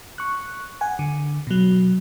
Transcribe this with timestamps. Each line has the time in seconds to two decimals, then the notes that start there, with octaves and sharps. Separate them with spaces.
0.18 C#6 F#6
0.81 F#5 G#5
0.99 D3
1.47 B2 F#3